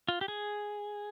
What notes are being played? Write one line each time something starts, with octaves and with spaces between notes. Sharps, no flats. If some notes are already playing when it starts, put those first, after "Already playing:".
F4
G4
G#4